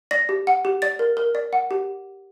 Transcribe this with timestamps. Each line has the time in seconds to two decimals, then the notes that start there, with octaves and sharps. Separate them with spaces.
0.11 D5 A#6
0.29 G4
0.47 F#5
0.65 G4
0.82 D5 A6
0.99 A#4
1.17 A#4
1.35 D5
1.53 F#5
1.71 G4